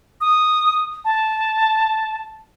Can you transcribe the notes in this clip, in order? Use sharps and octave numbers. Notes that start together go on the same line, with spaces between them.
D#6
A5